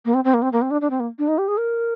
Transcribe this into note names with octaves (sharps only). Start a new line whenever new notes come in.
A#3
C4
C4
A#3
C4
A#3
C4
D4
D4
C4
A#3
D4
D#4
G4
G#4
A#4